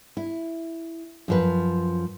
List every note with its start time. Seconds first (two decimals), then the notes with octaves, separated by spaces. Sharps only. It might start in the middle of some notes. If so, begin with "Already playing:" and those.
0.17 E4
1.28 F#2 F3 B4